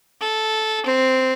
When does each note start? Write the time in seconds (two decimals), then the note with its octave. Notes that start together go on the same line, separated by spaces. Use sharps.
0.21 A4
0.86 C4